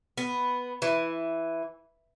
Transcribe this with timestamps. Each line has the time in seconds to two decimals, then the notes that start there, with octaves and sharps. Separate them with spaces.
0.17 B3
0.82 E3